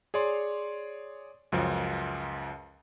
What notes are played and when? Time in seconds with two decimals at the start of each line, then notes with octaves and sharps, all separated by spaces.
0.14 G#4 C#5 D5 C6
1.52 C#2 F#2 F3